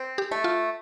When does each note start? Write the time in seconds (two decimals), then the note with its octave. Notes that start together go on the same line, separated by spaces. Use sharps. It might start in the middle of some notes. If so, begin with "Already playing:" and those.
Already playing: C4
0.18 G4
0.31 A3
0.44 F4